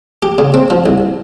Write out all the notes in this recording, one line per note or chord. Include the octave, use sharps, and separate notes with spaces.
G4
C#3
C4
F3
C2